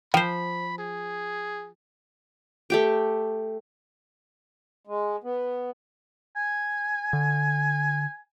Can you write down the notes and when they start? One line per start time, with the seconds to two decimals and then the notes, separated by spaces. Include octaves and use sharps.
0.14 F3 C5 G5 B5
0.78 G#4
2.70 A3 G4 G5
4.87 G#3
5.24 B3
6.36 G#5
7.13 D3